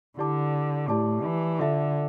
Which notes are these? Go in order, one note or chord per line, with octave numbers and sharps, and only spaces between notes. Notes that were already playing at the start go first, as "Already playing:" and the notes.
D3 E4 G4 D5 A5 D6
A2 E4 G4 D5 A5 D6
E3
D3 F4 A4 E5 A5